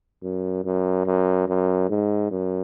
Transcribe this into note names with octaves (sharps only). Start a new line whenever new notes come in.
F#2
F#2
F#2
F#2
G#2
F#2